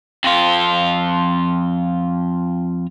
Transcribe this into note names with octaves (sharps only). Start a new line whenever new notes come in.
F2 F4